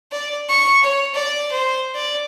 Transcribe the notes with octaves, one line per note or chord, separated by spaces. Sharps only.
D5
C#6
C#5
D5
C5
D5